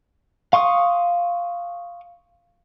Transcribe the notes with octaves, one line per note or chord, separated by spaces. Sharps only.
F5 C6 C#6 D#6